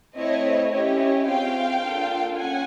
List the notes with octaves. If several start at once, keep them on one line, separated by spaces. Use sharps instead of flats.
A3 C4 E4 C#5 D#5
C#4 E4 G4 C#5 D#5
C4 F4 G#4 F5 G5
A#3 D4 F4 A4
C#4 F#5 G#5